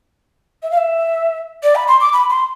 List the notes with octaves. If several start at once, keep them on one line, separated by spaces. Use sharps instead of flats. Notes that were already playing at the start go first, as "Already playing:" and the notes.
E5
F5
E5
D5
B5
C6
D6
B5
C6